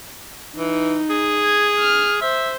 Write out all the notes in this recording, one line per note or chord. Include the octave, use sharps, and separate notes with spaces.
E3 D#4
G#4
G#6
F6
C5 E5